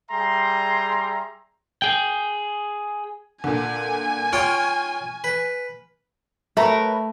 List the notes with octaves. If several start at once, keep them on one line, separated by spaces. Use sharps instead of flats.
G3 G#4 E5 G5 A#5 C6
G#4 G5
A#2 D3 G#5
F4 C#5 G5 C#6 F6
B4
A3 A#4 B4 C#5